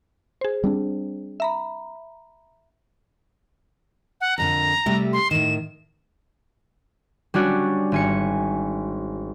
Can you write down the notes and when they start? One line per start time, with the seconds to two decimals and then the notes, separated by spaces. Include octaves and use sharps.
0.41 G#4 C5
0.64 G3 C4 D4
1.40 E5 A#5 B5
4.21 F#5
4.38 F2 A#2 D3 A#5
4.86 C3 G3 A3
5.13 C6
5.31 A2 D#3 E7
7.34 G3 C#4 D4 F#4
7.92 G#1 G#5 C#7